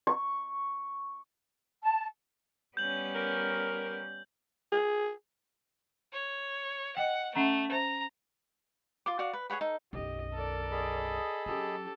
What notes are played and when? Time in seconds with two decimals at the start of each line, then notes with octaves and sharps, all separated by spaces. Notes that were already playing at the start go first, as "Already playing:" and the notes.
0.07 C#6
1.82 A5
2.77 G3 B3 C#4 G6 F#7
3.15 A#4
4.72 G#4
6.13 C#5
6.97 D#5 F#5 G5
7.35 A3 C#4 F#5 A#5
7.72 C5 A#5
9.06 F4 C6 D6
9.19 F#4 D5 F5 F#5
9.33 B4
9.50 G#4 C#5 F#5 B5
9.61 D#4 A4
9.93 B1 F#2 G4 D#5
10.34 A4 A#4 D5
10.71 G#4 D#5 B5
11.46 F#3 C#4 G4 A4